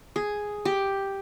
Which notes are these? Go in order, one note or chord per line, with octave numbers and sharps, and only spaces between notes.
G#4
G4